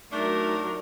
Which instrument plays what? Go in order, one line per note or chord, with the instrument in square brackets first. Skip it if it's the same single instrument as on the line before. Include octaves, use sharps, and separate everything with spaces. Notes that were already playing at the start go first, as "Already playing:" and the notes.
[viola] F#3 A#4 [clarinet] A3 [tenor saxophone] D4 [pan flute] D#4